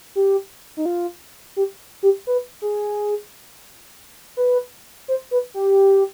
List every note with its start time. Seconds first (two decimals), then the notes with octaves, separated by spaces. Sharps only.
0.16 G4
0.77 D#4
0.86 F4
1.56 G4
2.03 G4
2.27 B4
2.62 G#4
4.37 B4
5.08 C5
5.31 B4
5.54 G4